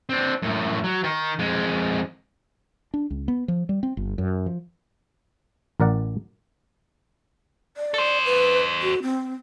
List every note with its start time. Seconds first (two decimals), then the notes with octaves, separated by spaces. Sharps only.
0.10 C4 D4
0.42 F#2 A2
0.84 F#3
1.04 D#3
1.39 F2 G#3
2.94 D4
3.10 C#2
3.28 B3
3.48 F3
3.69 G3
3.83 C4
3.97 G1
4.18 F#2
4.46 F3
5.80 A1 A#4 D5 F#5
7.77 D5
7.94 A4 C5
8.26 B4
8.82 F#4
9.02 C4